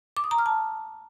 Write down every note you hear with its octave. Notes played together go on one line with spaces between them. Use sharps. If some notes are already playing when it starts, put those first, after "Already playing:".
D6
D#6
A#5
F6
A5